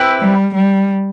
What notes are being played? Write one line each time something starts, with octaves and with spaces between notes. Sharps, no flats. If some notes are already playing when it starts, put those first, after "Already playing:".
Already playing: C4 E4 G4 B4
G3
G3